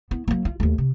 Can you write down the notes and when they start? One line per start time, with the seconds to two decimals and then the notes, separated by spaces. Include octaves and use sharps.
0.11 B3 E4
0.28 F#3 A#3
0.45 F4
0.60 D#2 A3
0.78 C3